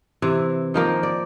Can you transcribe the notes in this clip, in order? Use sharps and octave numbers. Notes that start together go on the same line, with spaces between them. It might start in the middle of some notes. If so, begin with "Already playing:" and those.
C3 E3
D#3 F3 A#3
D5